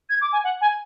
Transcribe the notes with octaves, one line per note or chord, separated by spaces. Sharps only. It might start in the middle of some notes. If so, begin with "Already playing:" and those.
G#6
D6
G#5
F#5
G#5